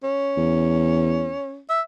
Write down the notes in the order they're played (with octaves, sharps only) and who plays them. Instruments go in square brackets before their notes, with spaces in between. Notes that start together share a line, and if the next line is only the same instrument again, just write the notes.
[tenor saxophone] C#4
[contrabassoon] E2
[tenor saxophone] E5